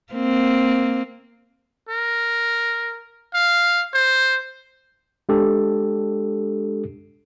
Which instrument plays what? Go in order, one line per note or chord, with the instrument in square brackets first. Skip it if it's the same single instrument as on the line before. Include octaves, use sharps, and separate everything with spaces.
[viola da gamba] A#3 C4
[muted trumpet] A#4
F5
C5
[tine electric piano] G#3 D4 G4 A4